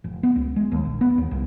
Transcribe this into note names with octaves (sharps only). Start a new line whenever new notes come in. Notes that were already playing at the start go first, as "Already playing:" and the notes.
F1
B3
C#2
G#3
D#2
A#1
B3
D#2
C2